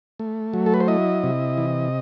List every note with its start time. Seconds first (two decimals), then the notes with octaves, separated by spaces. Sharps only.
0.20 A3
0.53 F#3
0.66 A4
0.74 B4
0.80 C5
0.88 E4 D#5
1.24 C3
1.57 E3